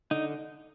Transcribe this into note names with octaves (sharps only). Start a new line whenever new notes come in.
D3 D#4